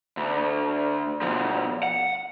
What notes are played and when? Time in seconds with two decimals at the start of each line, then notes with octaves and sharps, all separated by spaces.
0.17 D2
1.22 B2 F3
1.83 F#5